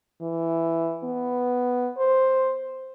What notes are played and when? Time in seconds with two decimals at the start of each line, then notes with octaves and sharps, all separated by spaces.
0.22 E3
1.04 B3
1.98 C5